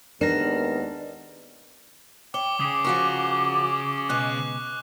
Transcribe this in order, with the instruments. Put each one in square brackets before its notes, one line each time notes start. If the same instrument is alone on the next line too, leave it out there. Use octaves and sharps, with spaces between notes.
[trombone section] D#2 G#3 B3 [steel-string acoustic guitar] D4 [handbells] A#4 A#6
[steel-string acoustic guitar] C#5 [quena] G5 [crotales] D6 G7
[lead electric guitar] C#3 G#4 [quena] D6 [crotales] D#6
[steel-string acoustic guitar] F3 F#4 A#4 [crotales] C#6
[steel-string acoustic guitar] B2 G#3 [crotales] C#6 F#6